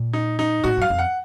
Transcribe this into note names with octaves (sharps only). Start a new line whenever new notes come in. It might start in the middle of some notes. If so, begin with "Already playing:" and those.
Already playing: A#2
D#4
D#4
A2 F#4
F#2 F5
F2
F#5